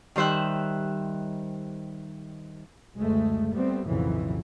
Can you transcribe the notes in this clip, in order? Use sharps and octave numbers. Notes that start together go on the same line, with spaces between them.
D#3 G3 C5 E5 F#6
F#1 D2 G#3 A3
G3 A3 B3 C4
B1 F2 A2 C#3 E3 F#3